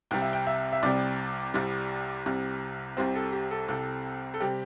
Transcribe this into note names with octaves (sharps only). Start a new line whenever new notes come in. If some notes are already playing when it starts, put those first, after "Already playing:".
C2 C3 G3 G5
E5
G5
E5
E5
C2 C3 G3 D5
C2 C3 G3
C2 C3 G3
C2 C3 G3 C4 C5
A4
G4
A4
C2 C3 G3 C4 A4
A4
C3 G3 C4 G4